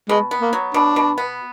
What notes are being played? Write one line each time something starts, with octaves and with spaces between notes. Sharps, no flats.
B2 G#3
B3
A#3
F#3
B2 D4
B2
B3